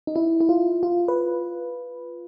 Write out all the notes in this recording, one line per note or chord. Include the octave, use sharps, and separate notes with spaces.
D#4
E4
E4
F4
F4
B4